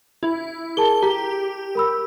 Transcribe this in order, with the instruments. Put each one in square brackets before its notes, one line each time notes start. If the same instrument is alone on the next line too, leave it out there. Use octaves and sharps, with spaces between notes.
[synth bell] E4
[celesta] G#4 A#4 A5 [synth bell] G7
[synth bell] G4 [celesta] A#5
[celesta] A#4 B5 E6